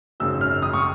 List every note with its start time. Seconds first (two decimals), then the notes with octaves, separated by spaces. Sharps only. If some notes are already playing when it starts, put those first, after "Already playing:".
0.20 G#1 F#2 C#3 F#3 E6
0.41 F6
0.62 D#6
0.73 C#6